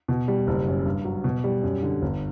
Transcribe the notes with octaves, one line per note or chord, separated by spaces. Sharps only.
B2
G3
F#1
F#2
G2
F#3
B2
G3
F#2
D3
G1